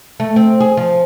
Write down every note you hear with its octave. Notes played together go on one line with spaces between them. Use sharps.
A3
C4
G#4
F3